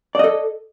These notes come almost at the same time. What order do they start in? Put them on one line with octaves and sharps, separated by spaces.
D5 D#5 A4